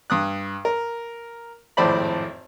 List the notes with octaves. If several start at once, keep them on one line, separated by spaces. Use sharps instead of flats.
G2 D#6 F#6
A#4
G#1 F2 A2 C5 D5 B5